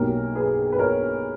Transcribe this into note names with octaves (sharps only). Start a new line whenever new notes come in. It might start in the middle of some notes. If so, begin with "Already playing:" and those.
Already playing: B1 B2 A#3 C#4 G4 A#4
G#4 B4
B4
A#4 C#5